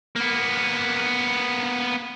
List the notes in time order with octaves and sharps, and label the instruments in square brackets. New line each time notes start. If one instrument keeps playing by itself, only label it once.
[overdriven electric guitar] A#3 B3